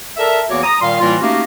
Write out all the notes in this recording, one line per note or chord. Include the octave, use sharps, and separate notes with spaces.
A4 A#4 D5 E5
E2 E3 A#3 F#4 C#5 D6
A#5 D#6
A#2 D#3 G3 F5 C6
A2 E3 G3 A#3 F4
A3 A#3 C#4 D#4 F#4 G4